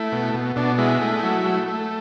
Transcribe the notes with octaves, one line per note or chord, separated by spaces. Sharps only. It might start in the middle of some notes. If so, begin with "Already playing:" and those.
Already playing: A3 E4
B2
B2
B2 D4
G#3 E4
A3
F#3
A3
A3